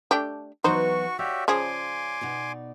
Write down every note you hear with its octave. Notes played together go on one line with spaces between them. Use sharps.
A3 D4 G4
E3 F#3 B3 D#4 F#4 C5 C#6
F#4 G4 C#5 D5 E5 F5
C#3 F3 G#4 G#5 C6 D6
B2 D#4 D5